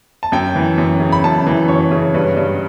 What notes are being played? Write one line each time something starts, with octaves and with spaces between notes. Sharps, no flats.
A5
F#2 G5
E3
F#2
C#3
B5
F#2 A5
E3
F#2 C#5
C#3
G2 B4
G2